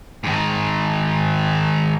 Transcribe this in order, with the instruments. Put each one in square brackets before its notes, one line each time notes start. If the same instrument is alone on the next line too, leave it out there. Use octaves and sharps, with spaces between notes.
[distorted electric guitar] G#2 D#3